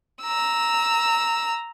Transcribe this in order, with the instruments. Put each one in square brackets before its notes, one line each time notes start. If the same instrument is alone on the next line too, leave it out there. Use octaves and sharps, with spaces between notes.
[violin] A#5 E6